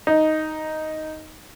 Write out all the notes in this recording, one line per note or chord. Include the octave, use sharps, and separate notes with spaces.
D#4